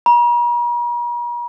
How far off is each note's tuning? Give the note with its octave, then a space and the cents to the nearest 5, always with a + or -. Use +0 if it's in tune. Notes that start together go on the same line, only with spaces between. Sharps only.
A#5 +45